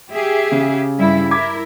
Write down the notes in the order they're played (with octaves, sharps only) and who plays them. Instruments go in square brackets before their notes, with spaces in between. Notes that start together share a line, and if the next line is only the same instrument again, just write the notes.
[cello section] G4 G#4 E5
[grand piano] C#3
[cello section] G2 G3 E4
[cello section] E4 A#4 [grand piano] D6 G#6 B6